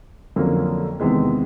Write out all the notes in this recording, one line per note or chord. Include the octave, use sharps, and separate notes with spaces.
F2 D3 F#3 A#3 C#4
E2 C3 D#3 G#3 B3